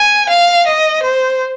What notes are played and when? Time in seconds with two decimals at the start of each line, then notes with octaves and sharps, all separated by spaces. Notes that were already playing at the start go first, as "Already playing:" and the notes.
Already playing: G#5
0.29 F5
0.67 D#5
1.03 C5